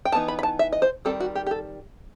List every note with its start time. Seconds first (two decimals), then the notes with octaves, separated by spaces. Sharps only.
0.05 G5
0.12 E3 B3 D#4 A5
0.28 B5
0.39 B5
0.43 A5
0.59 E5
0.72 D#5
0.82 C5
1.05 D#3 G3 C4 A4
1.20 F#4
1.35 G4
1.47 G4
1.51 A4